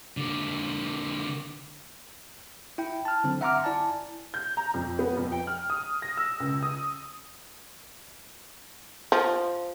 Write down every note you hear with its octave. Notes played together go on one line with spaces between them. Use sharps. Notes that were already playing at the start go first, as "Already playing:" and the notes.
D3 A#3
E4 G5
A5 F6
D3 F#3 C4
E5 F#5 A#5 C6 D6 F6
E4 D5 G#5 A5
G6
A#5
F2
B3
F2
G5
F6
D#6
A#6
E6
C#2
D#6
F3